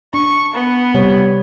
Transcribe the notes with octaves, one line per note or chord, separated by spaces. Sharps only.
D4 C#6
B3
C3 G3 C#5